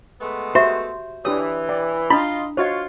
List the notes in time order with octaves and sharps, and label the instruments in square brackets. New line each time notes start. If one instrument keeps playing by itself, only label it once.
[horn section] G#3 A3 B3
[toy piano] F#4 G4 E5 [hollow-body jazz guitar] C5
[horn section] E3 [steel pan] D4 G4 D#6 [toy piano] C#5
[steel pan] D5 [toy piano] G5
[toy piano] D4 E4 [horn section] F4 D#5 [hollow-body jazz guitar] B5
[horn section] F4 [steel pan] F#4 C#5 [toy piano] C5 D#5